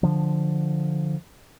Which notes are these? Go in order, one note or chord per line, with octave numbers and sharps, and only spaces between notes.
D3 F3